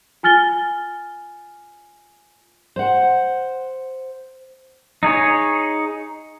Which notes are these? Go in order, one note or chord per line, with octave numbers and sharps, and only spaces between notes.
F4 G#5 F6 A6 G7
C5 F#5
D#4 G#4 C#5